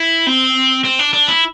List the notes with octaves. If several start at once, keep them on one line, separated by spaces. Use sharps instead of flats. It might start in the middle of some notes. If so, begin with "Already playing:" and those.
Already playing: E4
C4
C4
D4
D4
E4